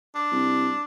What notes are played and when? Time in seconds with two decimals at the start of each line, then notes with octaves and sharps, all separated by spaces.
0.15 D4
0.32 C2